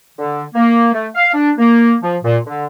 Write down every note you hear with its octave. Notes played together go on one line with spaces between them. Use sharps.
D3
A#3
A3
F5
D4
A#3
F3
A#2
D3